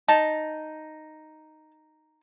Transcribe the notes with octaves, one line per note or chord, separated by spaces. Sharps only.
D#4 A5